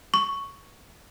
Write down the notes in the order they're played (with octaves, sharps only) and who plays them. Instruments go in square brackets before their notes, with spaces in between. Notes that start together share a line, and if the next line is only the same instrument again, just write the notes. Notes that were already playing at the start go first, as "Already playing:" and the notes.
[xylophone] C#6